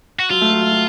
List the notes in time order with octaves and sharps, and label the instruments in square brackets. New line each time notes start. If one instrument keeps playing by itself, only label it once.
[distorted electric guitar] F#4
[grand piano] F#3 [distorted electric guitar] F4
[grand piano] A3
F#3
A3
F#3